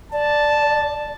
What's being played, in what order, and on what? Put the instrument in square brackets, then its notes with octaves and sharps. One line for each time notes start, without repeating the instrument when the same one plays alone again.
[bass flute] D5 [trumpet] A5